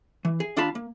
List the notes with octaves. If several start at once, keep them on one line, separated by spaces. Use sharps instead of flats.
E3
G#4
D#2 D4 F4 F5 A5 B5
A#3